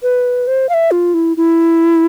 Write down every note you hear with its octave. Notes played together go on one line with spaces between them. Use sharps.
B4
C5
F5
E5
F4
E4
E4